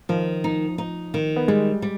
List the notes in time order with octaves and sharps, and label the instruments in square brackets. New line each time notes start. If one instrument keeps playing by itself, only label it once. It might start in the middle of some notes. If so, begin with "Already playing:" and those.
[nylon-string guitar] D#3 [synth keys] F3
[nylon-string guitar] D#4
D#4
D#3
[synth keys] B3
[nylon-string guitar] G3 [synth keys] G#3
[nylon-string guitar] G3